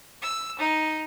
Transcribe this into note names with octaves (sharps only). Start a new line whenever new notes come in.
E6
D#4